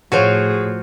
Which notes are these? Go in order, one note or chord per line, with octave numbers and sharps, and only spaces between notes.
A2 F3 F4 F#4 G#4 C#5